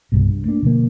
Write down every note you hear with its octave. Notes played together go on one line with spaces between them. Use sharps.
C2 G2 B2
G2
A3 A#3 D4
B2 D3 F3 A#3